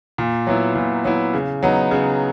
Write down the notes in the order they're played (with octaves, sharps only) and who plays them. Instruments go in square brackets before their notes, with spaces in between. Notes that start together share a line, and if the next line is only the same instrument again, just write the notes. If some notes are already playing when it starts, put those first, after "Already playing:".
[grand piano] A#2
F#3 B3 E4
A#2
F#3 B3 E4
C#3
F#3 B3 D#4
C#3